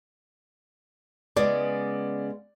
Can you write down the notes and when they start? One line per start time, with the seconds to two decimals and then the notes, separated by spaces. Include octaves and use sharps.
1.36 C#3 G#3 B3 D5